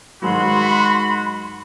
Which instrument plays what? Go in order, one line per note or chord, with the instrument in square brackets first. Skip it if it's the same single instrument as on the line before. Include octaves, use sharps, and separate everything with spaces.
[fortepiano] G#2 D#3 F#3 [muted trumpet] F#4 [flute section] B5 C6